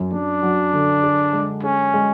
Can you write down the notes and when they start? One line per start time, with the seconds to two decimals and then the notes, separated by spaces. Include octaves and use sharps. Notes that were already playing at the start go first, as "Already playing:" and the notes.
Already playing: F#2
0.12 F#2 D4
0.43 F#3
0.73 D3
1.03 G#4
1.33 G#3
1.63 C#4 G#4
1.94 G#3